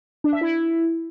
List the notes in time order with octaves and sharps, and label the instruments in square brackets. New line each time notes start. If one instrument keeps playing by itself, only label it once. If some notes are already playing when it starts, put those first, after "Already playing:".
[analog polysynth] D4
E5
E4